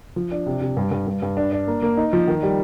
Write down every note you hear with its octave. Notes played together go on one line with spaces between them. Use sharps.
F3
D4
C3
C3
G2
G2
G2
G2
D4
D4
A#3
A#3
D#4
F3
D#3
G3